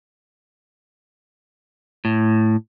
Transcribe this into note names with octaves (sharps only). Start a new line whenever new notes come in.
A2